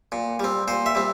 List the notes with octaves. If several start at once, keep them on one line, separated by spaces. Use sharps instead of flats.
A#2
G3 C4
A#2 C5
E5
G3 C4